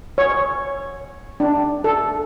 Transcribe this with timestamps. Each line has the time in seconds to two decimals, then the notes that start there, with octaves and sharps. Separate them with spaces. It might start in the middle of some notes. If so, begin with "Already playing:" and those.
0.18 C#5
1.40 D4
1.84 A4